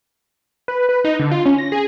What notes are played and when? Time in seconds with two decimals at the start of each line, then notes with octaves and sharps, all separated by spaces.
0.68 B4
0.89 B4
1.05 D#4
1.20 D3
1.31 F4
1.46 C#4
1.58 A#6
1.72 G#4